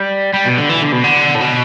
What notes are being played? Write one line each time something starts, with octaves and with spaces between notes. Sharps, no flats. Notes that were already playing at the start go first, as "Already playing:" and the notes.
Already playing: G3
G3
B2
D3
E3
D3
B2
D3
A2
B2